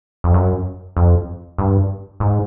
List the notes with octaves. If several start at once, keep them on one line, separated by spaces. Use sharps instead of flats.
F2
F#2
F2
G2
G#2